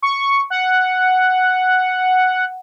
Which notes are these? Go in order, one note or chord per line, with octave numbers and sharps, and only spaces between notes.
C#6
F#5